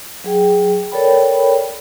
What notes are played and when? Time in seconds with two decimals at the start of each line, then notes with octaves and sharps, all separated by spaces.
0.24 F#3 G#4 G5
0.92 A4 A#4 C#5 D5 G5 B5